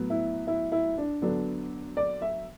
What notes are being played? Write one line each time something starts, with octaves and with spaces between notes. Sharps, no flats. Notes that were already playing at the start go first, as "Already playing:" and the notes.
Already playing: A2 F#3 B3
E4
E4
E4
D4
D3 F#3 B3 D4
D5
E5